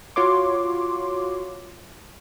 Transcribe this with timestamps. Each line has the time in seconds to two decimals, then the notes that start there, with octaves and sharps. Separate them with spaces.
0.16 F4 F#4 C#5 C6 D6